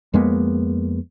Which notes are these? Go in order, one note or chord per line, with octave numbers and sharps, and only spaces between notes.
F2 G#3 A#3 B3